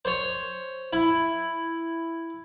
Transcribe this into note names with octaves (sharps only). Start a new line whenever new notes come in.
C5 C#5
E4